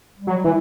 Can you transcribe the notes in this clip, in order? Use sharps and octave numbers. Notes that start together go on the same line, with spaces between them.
G3
F#3
E3